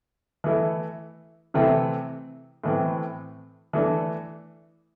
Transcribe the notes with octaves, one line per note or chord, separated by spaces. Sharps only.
E3 A3 E4
C3 E3 A3 C4 E4
A2 E3 C4
E3 A3 D4